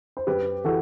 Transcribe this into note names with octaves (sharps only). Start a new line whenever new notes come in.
C5
F#2 G4 B4
E3 F#4 A4